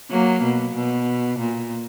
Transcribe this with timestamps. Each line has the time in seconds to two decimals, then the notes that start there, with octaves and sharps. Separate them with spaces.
0.10 F#3 A#3
0.42 B2
0.74 B2
1.38 A#2